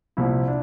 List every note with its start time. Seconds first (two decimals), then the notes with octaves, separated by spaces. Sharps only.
0.17 C2 A#2 F3 E4
0.48 D4